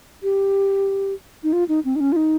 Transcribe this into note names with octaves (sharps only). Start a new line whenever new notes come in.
G4
D#4
F4
D#4
C4
D#4
C#4
F4
D#4